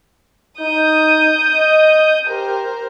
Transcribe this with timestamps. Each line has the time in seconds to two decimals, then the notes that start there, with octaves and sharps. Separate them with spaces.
0.60 D#4 D#6 G6
1.55 D#5
2.27 G4 A#4 C5